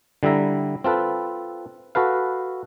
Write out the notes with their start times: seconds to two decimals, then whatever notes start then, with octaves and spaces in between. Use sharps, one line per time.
0.23 D3 G3 E4 E5 A#5
0.84 C4 F4 A4 B4
1.95 F#4 A4 B4 F5